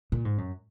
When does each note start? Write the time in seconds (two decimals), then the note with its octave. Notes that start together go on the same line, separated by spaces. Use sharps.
0.12 A#2
0.25 G#2
0.38 F#2